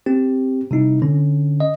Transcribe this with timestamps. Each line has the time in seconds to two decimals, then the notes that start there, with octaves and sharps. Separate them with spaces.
0.06 C4 G4
0.71 C3 G3 D#4 E4
1.02 D3 C#4
1.60 D#5